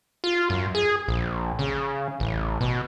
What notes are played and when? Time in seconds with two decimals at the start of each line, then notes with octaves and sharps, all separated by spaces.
0.24 F4
0.50 F#2
0.75 G#4
1.08 A#1
1.59 C#3
2.20 A1
2.61 B2